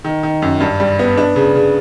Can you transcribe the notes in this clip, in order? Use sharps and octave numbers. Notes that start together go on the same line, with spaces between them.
D#3
D#3
F#2
G2
G3
B3
D4
C#3
C#3